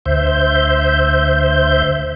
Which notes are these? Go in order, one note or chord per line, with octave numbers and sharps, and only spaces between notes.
D2 C5 E5 G6